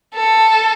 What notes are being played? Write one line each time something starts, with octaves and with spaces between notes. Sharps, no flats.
A4